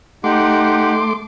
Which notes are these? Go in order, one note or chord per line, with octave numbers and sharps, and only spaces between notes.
A3 D#4 G4 F#5 C6 D6